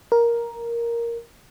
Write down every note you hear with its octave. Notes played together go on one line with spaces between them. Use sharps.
A#4